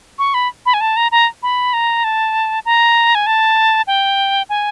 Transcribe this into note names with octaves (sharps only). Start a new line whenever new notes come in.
C#6
B5
B5
G#5
A5
A#5
A#5
B5
A#5
A5
A#5
G#5
A5
G5
G#5